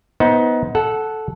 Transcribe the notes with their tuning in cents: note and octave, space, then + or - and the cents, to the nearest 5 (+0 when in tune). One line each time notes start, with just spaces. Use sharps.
B3 +0 D#4 +25 C5 +0
A4 -10 F#5 +0